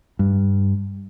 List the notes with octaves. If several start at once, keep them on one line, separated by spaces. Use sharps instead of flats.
G2